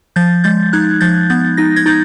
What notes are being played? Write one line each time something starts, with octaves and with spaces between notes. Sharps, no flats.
F3 G6 A6
G#3 G6 A6
D#4 F#6 G#6
F3 G6 A6
B3 G6 A6
D#4 A#6
G#6 A#6
D#4 G6 A6